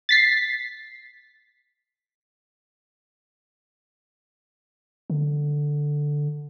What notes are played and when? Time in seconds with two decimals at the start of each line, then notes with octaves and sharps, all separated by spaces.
0.09 A6 B6 C7
5.10 D3